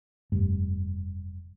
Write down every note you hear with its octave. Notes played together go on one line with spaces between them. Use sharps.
F1 G2